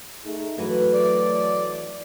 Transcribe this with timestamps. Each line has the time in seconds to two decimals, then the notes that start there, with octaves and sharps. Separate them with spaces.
0.25 A3 D#4 G#4
0.58 E3 F#3 A3 F#4 B4
0.94 D5